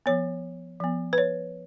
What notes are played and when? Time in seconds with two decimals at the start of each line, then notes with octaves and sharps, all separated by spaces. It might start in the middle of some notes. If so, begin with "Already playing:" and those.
0.06 F3 B3 C#5
0.80 F3 B3
1.13 B4
1.18 C#5